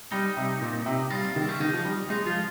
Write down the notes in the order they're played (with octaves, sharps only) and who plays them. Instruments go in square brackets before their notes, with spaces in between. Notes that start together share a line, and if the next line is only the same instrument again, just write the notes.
[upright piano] G3 [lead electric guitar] D#4
[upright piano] C3
A#2
C3
[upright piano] G3 [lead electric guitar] F4
[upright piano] D#3 [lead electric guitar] C4
[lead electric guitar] C#4
[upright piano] D#3 [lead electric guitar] D#4
[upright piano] F3
G3
[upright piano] G#3 [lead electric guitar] D#4
[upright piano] F3 [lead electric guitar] F4